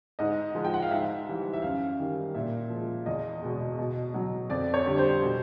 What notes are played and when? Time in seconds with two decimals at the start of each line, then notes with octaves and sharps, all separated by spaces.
0.19 G#2 D#5
0.55 F3 G#3
0.65 G5
0.74 F#5
0.82 F5
0.91 G#2 E5
1.26 E3 G3
1.53 E5
1.62 F#2 F5
1.99 D#3 G3
2.35 A#2 E5
2.70 F3 G#3
3.06 E2 D#5
3.42 B2 G#3
3.79 B2
4.14 F#3
4.50 F2 D5
4.74 C#5
4.86 D3 G3
4.98 C5
5.22 B2